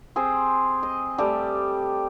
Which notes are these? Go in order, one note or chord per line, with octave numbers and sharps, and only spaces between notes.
C4 G#4 C5
D#5
G3 A3 G4